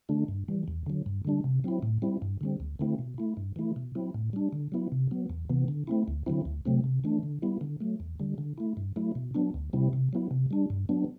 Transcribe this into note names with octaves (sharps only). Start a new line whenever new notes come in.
D3 A3 D4
G2
E3 G3
E2
D3 F#3
G2
D3 G3 D4
C3
F#3 C4 E4
A2
G3 C4 E4
G2
D3 G3 C4
D2
D3 A3 C4 E4
B2
A3 E4
G2
E3 A3 E4
B2
F#3 C4 E4
A2
G3 D4
D3
F#3 B3 E4
C3
F#3 B3
E2
C3 E3 B3
D3
A3 C4 E4
D2
D3 F#3 C4 E4
D2
C3 F#3 A3 C4
C3
E3 A3 D4
D3
G3 B3 E4
D3
F#3 A3
E2
D3 G3
D3
A3 E4
G2
F#3 A3 E4
B2
F#3 B3 D4
D2
C3 G3 C4 E4
C3
F#3 B3 E4
C3
G3 D4
G2
F#3 B3 D4